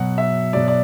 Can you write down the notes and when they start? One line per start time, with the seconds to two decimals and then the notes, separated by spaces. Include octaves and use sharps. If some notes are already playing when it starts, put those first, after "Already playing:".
Already playing: B2 F#3 F#5
0.18 E5
0.53 B2 F#3 D5
0.68 D5